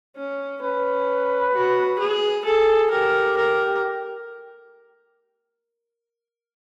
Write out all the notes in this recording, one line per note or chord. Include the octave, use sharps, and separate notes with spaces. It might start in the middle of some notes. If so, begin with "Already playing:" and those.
C#4
C#4 B4
F#4
G#4
G#4 A4
G4 A#4
A#4